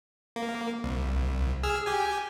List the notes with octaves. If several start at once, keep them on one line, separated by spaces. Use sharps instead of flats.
A#3
C2
G#4 E6 F6
G4 G#5